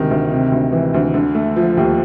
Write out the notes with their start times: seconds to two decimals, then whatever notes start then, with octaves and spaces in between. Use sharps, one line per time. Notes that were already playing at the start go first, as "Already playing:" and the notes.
Already playing: D2 C3 D#3
0.11 D2
0.32 C3
0.52 D2
0.72 E3
0.94 D2
1.14 D3
1.35 A3
1.56 F3
1.77 D#2